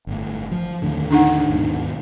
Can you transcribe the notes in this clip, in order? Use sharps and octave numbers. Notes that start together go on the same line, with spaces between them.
G1 A2
F3
D#2 A2 D3
D4 D#4 F#5
D#2 G#2 B2